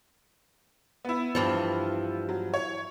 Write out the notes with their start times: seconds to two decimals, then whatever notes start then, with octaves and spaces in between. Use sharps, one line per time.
1.05 B3 E4
1.35 G2 E3 F3
2.29 F#3
2.54 C#5